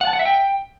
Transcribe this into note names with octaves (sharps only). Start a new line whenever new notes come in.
F#5
A5
F#5
E5
G5